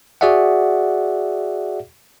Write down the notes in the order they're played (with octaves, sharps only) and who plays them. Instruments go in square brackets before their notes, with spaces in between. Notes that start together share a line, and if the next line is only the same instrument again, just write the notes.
[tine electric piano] F#4 G#4 D5 E5 F#5